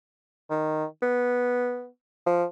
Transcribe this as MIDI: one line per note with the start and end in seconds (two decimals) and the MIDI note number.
0.51 0.85 51
1.02 1.87 59
2.26 2.45 53